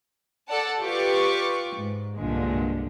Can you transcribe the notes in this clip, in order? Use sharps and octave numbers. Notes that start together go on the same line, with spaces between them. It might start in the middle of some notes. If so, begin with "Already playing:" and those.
A4 D5 F#5 A5
F4 G4 B4 D5 C#6 D6
G#2
C2 G2 A#2 D3 G#3